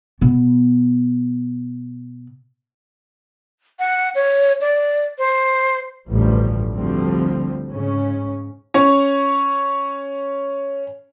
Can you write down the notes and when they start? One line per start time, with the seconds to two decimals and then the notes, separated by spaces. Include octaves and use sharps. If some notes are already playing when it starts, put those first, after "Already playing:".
0.21 B2 B3
3.79 F#5
4.15 C#5
4.61 D5
5.18 C5
6.09 A1 D2 G2 F3 G3
6.73 D2 D3 F3 G3 C4
7.70 G#2 C#3 C#4
8.74 C#4 C#5